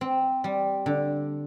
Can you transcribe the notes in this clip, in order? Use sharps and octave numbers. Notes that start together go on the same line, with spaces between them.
C4
G3
D3